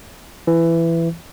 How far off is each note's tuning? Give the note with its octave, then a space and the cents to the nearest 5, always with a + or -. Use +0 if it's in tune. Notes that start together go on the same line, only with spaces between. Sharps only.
E3 +15